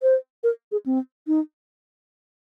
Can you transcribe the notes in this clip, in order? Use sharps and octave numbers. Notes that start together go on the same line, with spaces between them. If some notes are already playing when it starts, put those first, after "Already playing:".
C5
A#4
G#4
C4
D#4